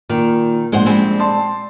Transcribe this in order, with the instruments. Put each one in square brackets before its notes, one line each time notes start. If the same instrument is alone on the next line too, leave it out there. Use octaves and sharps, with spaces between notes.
[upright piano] A#2 [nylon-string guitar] D#3
[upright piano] A#1 [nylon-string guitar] G#3 C5 F#5
[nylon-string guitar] G3 G#3 C4
[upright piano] D5 A5 C6